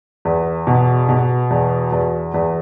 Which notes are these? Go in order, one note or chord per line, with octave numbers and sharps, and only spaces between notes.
E2
B2
B2
E2
E2
E2